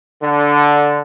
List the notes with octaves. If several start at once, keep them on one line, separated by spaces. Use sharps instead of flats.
D3